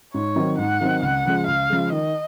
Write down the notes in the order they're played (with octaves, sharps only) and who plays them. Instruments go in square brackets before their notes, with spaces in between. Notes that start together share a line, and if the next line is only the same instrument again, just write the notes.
[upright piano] G#2 [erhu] C#5
[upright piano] D#3 F#3 C4 D#4
[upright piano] G#2 [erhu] F#5
[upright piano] D#3 F#3 C4 D#4
[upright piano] C#2 [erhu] F#5
[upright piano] C#3 F3 G#3
[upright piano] C#2 [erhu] F5
[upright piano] C#3 F3 G#3
[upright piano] D#3 [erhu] D#5